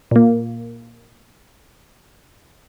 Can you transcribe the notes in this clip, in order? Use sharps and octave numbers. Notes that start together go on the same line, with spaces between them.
A#2 A#3